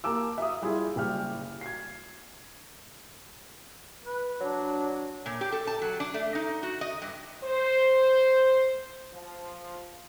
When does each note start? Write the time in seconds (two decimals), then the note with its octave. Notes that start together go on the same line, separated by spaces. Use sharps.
0.04 A#3 G4 A5 D6 E6
0.38 E5 F5 D#6
0.62 G3 E4 F4 G4 G#4
0.96 F#1 G3 G4 F6
1.61 G#6 C7
4.05 B4
4.40 F#3 D4
5.26 A#2
5.41 G4
5.52 A4
5.67 A5
5.82 F#3
6.00 D4
6.14 A3
6.35 D#4
6.63 F#4
6.81 D#5
7.02 G2
7.43 C5
9.13 F3